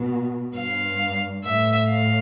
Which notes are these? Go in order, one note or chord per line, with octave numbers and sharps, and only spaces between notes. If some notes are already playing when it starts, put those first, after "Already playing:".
Already playing: B2
G2 F5
A2 E5
F5